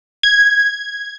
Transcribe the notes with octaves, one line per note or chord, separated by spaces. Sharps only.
G#6